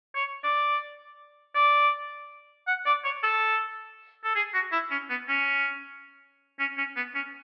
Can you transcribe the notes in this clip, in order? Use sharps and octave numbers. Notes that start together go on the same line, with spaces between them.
C#5
D5
D5
F#5
D5
C#5
A4
A4
G#4
F#4
E4
C#4
B3
C#4
C#4
C#4
B3
C#4